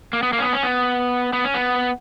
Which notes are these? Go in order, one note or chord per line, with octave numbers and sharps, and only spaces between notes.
A#3
B3
A#3
C#4
B3
C#4
B3
B3
C#4
B3